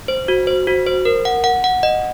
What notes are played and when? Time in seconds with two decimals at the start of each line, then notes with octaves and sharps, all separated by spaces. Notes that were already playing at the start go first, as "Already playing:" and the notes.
0.08 C5
0.28 F#4
0.47 C5
0.67 F#4
0.87 C5
1.05 A#4
1.25 F#5
1.44 F#5
1.64 F#5
1.83 D#5